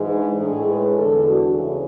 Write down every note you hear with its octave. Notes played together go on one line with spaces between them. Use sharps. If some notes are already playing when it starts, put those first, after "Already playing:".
Already playing: G#2 E3 G#3
D4
A2 G#3 G#4
B4
E2 D3 G#3 A4
F#4
D2 C#3 E3 G#4